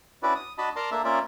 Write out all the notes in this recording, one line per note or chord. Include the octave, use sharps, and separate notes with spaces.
C#4 D4 E4 F#4 B4 D5
D#6
D4 F#4 D#5 A5 B5
A#4 D5 A5 A#5 C6
A#3 D4 A4 E5
A#3 C#4 F4 D5 E5